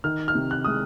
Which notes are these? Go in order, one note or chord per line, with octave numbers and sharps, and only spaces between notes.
D#3 F6
F6
C3
F#6
G#3 D#6